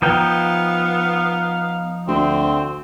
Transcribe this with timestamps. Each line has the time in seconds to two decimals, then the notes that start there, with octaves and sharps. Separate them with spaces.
0.02 F3 B3 D#4 F5 G5
2.08 D2 C4